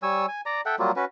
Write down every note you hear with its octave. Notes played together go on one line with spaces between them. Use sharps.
G3 C#5 G#5 E6
G#5
D5 A#5
A4 E5 F#5 G5
F#3 G3 A#3 F4
C#4 F#4 B4